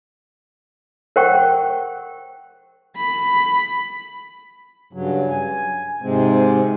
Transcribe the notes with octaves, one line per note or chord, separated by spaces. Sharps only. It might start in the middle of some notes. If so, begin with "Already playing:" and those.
A#4 C5 F#5 G5 C#6
B5
G2 C#3 F#3
G#5
G#2 C3 G#3 C4